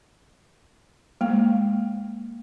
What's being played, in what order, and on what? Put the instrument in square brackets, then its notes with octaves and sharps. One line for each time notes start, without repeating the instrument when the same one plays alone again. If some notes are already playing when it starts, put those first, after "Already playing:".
[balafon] G#3 A#3